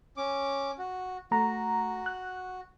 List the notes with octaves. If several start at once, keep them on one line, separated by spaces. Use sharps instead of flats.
C#4 D6
F#4
A3 F#4 A#5
F#6